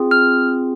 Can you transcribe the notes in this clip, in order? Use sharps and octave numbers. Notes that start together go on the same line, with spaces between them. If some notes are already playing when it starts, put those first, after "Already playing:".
Already playing: C4 F4 G#4
F6